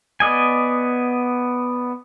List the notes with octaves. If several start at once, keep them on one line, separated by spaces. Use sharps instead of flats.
B3 D5 D#5 G#5